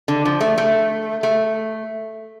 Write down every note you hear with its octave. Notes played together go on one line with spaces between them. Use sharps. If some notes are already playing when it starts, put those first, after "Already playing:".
D3
F3
A3
A3
A3